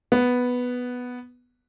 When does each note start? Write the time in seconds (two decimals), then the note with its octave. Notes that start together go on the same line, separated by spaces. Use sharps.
0.12 B3